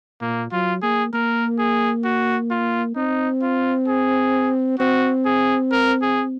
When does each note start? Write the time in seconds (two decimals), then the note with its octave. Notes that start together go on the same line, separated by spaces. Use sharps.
0.21 A#2 A#3
0.52 F#3 F4
0.82 A#3 G#4
1.13 A#3 A#4
1.59 G#4
2.05 F#4
2.51 F4
2.96 C4 D#4
3.42 F4
3.88 G#4
4.79 C4 F#4
5.25 G#4
5.72 A#4
6.02 G#4